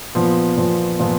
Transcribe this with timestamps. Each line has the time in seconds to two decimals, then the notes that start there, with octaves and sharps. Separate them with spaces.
0.15 A#2 F3 B3
0.57 A#2 F3 B3
0.99 A#2 F3 B3